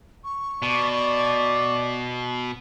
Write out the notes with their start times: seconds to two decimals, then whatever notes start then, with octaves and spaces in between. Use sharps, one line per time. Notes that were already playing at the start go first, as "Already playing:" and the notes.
0.24 C#6
0.62 B2 D5